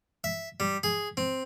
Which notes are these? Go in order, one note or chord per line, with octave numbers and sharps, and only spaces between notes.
E5
G3
G#4
C4